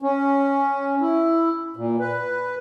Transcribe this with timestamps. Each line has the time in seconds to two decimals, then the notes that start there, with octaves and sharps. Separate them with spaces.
0.02 C#4
1.01 E4
1.76 A#2
2.00 B4